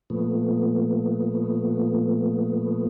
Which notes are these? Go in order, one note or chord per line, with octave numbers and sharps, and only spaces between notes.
A#2 F3 A3 B3